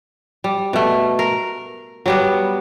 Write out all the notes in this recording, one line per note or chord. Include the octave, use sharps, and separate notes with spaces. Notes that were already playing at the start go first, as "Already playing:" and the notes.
G3
B2 A3
A#4
F#3 G3 B3